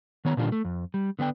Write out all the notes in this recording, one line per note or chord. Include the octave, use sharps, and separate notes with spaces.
D#3 B3 C#5 A#5
A#2 D3 D#3 G3 D4 F4
A3
F2
G3
D3 B3 D4 G5